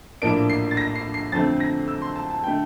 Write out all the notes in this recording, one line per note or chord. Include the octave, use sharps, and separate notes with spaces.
A#1 A2 F3 A#3 D4 D7
C7
A6
A#6
C7
C7
F2 D3 A3 C4 A6
A#6
E6
C6
A5
A5
D3 A3 G5